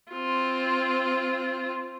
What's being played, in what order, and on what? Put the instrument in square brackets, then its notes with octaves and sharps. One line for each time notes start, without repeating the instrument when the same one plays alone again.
[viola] C4 F4